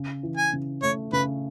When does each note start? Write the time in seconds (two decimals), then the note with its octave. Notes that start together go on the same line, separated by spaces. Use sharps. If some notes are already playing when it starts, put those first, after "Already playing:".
Already playing: C#3
0.23 E3
0.37 G#5
0.53 C#3
0.83 A3 C#5
1.13 C#3 B4